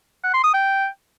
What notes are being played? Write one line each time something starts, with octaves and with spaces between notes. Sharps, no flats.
F#5
C6
D#6
G5